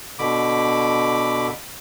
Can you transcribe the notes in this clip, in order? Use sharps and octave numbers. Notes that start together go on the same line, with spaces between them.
B2 D3 B5 D6